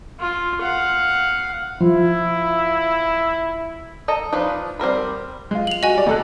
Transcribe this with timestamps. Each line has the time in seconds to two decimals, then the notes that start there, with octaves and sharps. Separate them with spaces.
0.20 F4
0.61 F5 F#5
1.80 F3 E4
4.08 A4 D#5 A#5
4.33 F3 D4 D#4 B4
4.80 G3 C4 A#4 B5
5.51 G#3 F4
5.67 F7 F#7
5.83 F#4 D#5 G#5
5.94 G3 D5
6.07 D2 A4 F#6